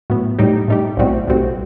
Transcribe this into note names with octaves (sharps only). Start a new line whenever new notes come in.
A2 F#3 B3
A2 G3 D#4 G4
A2 G3 D#4 G4
B1 A2 G3 C4 F#4
B1 A2 G3 C4 F#4